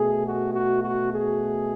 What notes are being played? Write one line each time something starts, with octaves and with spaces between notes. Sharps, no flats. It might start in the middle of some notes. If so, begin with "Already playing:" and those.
Already playing: B2 A3 G#4
F#4
F#4
F#4
G#4